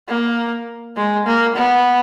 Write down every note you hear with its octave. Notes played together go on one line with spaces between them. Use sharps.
A#3
G#3
A#3
B3